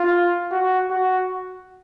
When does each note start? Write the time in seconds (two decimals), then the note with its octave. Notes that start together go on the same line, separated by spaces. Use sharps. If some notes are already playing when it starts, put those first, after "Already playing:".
Already playing: F4
0.52 F#4
0.90 F#4